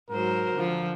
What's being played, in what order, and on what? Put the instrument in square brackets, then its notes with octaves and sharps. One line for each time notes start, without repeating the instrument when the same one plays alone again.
[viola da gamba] G#2 F#3 C5 [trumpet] A#4
[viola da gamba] D3 F3